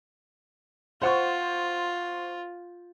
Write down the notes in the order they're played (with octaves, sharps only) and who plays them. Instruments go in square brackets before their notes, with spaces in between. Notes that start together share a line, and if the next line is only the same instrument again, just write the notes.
[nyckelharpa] F4 [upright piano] C5 F#5 C#6